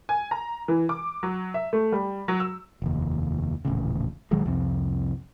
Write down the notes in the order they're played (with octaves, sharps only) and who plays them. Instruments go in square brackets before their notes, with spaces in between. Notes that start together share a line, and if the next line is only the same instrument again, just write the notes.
[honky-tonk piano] G#5
A#5
E3
D6
F#3
E5
A3
G3
F#3
E6
[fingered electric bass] F1 D#2
D#1 A1 C#3
A#1 D#3 F#3 G#3
C2 F2 C4